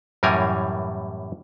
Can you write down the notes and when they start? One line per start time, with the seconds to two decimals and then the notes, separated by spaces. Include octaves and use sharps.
0.23 F#2 A2 E3 G3 A#4 G#5